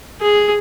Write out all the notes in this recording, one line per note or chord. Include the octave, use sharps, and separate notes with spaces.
G#4